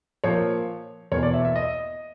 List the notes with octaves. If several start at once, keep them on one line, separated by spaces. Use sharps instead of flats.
A#2 F3 C#5
E2 B2 C#5
D5
E5
E5
D#5